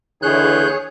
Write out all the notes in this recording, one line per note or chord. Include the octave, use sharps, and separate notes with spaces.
D#2 D3 E3 G#4 C#5 F#6 G6